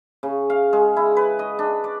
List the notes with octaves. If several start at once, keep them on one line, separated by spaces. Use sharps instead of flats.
C#3
F5
G#3
E4
B4
D#5
D4
D5